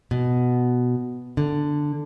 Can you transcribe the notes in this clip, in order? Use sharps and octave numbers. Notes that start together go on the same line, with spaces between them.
B2
D3